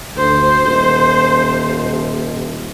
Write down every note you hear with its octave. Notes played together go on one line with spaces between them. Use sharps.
D2 C5
D#1